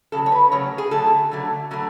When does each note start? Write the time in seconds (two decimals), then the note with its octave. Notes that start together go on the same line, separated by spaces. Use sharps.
0.12 C#3 F#3 A3 A4
0.26 C#5
0.32 B4
0.51 C#3 F#3 A3 C#5
0.78 G#4
0.91 D3 F#3 A3 A4
1.31 D3 F#3 A3
1.71 D3 F#3 A3